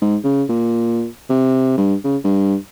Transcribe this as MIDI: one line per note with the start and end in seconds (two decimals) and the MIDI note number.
0.02 0.17 44
0.24 0.44 49
0.49 1.06 46
1.30 1.74 48
1.78 1.95 43
2.04 2.17 49
2.24 2.55 43